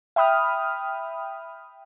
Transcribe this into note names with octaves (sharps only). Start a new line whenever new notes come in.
E5 G5 B5 D#6 F6